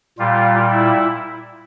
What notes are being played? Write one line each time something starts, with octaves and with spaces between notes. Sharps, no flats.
A#2 G3 F4
E4